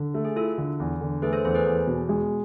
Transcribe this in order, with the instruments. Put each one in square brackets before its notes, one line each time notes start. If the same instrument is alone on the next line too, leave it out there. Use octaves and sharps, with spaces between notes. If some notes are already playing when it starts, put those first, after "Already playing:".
Already playing: [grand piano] D3
A3
[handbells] G#4
[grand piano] E4 [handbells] F4 A4
[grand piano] D3
E2
D3
[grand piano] A3 [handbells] G#4 B4
[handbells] A4 C5
[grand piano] E2 [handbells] A4 C5
[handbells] G#4 B4
[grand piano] E2 [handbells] G#4
[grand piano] B2
G#3